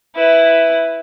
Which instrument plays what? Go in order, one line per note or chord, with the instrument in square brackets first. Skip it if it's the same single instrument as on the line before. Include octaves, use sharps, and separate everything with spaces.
[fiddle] E4 B4